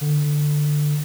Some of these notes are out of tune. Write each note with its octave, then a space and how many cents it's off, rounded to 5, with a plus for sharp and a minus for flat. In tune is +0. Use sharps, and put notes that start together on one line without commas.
D3 +10